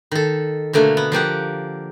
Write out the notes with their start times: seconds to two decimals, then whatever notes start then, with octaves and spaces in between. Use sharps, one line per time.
0.12 D#3 A4
0.73 B2 D3 A3 A#3
0.97 B3
1.12 F3 A#3 G4 F#5